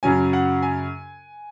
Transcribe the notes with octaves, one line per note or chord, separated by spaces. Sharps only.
F#2 C#3 F#3 C#4 G#5
F#5
G#5